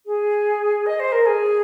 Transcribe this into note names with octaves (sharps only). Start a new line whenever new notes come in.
G#4
D#5
C5
A#4
G#4